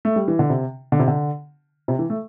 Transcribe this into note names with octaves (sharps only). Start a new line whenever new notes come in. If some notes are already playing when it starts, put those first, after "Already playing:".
A3
G3
E3
D3
C3
D3
C3
D3
C3
E3
A3